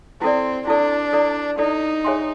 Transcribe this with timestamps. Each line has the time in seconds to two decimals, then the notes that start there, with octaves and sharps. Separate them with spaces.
0.22 C4 E4 A4 D5
0.67 D4 E4 A4 D5
1.13 E4 A4 D5
1.59 D#4 E4 A4 D5
2.05 G#4 C#5 E5 G#5 C6